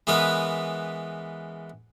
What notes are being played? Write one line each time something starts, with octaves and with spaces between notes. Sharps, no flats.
E3 G#3 B3 A#4 B4